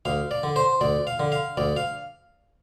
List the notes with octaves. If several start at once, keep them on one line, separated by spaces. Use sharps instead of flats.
D2 F5
D5
D3
C5
D2 D5
F5
D3
F5
D2 D5
F5